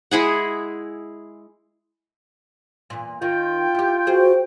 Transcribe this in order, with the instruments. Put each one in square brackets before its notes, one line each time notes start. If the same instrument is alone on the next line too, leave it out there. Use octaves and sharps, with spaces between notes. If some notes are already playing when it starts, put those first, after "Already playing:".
[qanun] G#3 E4 G#4 F#5
[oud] E2 A#2
[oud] D#3 [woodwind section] F4 G5
[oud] E4 G4
[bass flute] F#4 [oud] G#4 C5